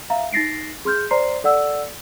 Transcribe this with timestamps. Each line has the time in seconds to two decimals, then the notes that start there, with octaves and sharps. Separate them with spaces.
0.10 E5 F5 A#5
0.33 D#4 A6 A#6 C7 D7
0.85 G#4 C6 F6 G6
1.11 C5 D5 A#5 C6 C7
1.44 A4 D5 F#5 E6